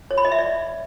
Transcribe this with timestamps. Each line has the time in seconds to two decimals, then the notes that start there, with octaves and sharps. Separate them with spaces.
0.11 C#5
0.18 B5
0.25 D#5
0.32 E5
0.39 D5